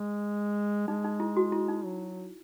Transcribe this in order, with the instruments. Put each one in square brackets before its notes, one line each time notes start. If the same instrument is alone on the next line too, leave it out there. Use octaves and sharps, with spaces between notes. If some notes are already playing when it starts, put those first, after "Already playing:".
Already playing: [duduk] G#3
[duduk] G#3 [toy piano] D#4
[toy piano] D#4
E4
F#4
E4
D#4
[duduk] F#3